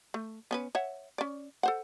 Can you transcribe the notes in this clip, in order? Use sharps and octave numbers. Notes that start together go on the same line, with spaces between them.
A3
B3 C#4 B4
C#5 E5 F#5
C#4 D5
A4 C5 F#5